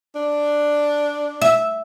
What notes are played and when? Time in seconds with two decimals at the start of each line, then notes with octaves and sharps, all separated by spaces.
0.15 D4
1.42 E5